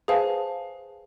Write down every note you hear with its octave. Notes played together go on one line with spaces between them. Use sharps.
G#4 B4 C5 F5 G#5 A5